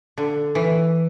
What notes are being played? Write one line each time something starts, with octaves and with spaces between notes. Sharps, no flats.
D3
E3